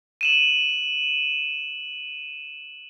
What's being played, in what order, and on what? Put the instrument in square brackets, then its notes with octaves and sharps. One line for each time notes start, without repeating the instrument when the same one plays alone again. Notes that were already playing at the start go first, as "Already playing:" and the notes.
[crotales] D#7 E7 F#7